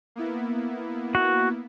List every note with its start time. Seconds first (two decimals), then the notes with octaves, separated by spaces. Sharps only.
0.16 A#3 B3 E4
1.15 F#4